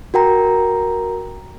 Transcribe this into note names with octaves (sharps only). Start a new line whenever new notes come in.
F#4 A#4 G5 A#5